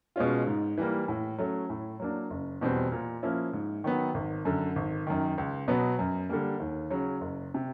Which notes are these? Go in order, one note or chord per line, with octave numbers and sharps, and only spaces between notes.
B2 G#3 C#4 F4
G#2
E3 G3 A#3
A2
F#3 A3 C#4
A2
F#3 A#3 D4
F#1
E2 B2 G3 C4
A#2
F3 A#3 C#4 E4
G#2
D#3 F#3 B3
G#1
F#2 D3
G#1
F#2 D#3
C#2
B2 F#3 B3
F#2
D3 G3 A#3
D#2
C#3 F#3
F#1
C3